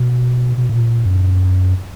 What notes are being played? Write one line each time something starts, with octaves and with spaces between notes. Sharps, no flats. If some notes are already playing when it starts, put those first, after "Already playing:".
Already playing: B2
B2
A#2
F#2